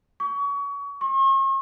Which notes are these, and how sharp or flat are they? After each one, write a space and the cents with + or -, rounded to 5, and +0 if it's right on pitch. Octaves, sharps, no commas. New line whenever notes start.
C#6 +30
C#6 -45